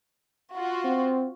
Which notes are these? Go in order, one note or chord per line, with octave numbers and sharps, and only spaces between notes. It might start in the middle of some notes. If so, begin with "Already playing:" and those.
F4 F#4
C4